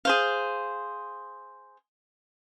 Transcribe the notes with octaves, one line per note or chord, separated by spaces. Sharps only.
G#4 C5 F5